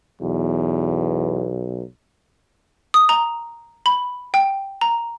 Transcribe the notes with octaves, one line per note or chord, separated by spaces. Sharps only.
B1 E2
D#6
A#5
B5
G5
A#5